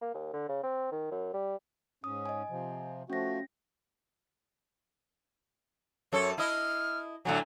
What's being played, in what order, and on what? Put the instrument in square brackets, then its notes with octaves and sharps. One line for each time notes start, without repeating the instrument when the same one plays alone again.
[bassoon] A#3
D#2
D3
C#3
C4
D#3
F#2
G3
[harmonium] G#2 C#4 [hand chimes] D#6
[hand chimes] D#5 G#5
[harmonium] C3 F3
[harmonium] F3 A3 F#4 [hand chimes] C#4 A#6
[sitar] F#2 A4 [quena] C#5
[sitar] E4 D#5 [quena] F6
[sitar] A2 D3 F#3 [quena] G#5